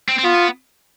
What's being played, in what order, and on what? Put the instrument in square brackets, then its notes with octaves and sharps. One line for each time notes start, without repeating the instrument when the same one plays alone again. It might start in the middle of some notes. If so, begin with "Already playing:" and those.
[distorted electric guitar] C4
C4
[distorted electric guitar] B3 [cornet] F4